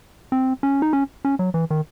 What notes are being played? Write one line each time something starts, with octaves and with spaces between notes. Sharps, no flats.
C4
C#4
D#4
C#4
C#4
F#3
E3
D#3